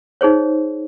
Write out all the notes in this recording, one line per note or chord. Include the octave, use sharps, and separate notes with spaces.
D#4 G#4 C5 C#5